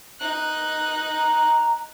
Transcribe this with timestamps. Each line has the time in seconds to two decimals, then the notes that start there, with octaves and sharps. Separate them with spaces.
0.20 D#4 F#6
1.17 A#5